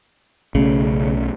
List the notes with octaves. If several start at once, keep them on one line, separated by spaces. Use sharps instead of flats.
B1 C#3 A3 C#4